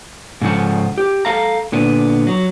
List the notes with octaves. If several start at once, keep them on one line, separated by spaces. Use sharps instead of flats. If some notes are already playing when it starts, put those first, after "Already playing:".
G#2 C#3 F3 A4 F#5
G4
A4 F5 A#5
A#2 D3 B3
F#3